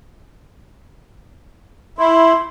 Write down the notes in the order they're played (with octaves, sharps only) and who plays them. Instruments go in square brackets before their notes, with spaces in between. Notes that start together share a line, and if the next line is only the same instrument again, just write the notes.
[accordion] E4 [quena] C6